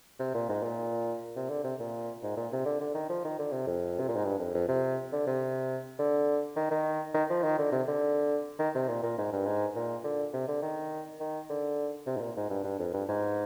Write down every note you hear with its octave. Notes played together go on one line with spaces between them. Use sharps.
C3
A#2
G#2
A#2
C3
D3
C3
A#2
G#2
A#2
C3
D3
D3
D#3
F3
D#3
D3
C3
F2
C3
A#2
G#2
G2
F2
F2
C3
D3
C3
D3
D#3
D#3
D#3
F3
D#3
D3
C3
D3
D#3
C3
A#2
A#2
G#2
G2
G#2
A#2
D3
C3
D3
D#3
D#3
D3
C3
G#2
A#2
G#2
G2
G2
F2
G2
G#2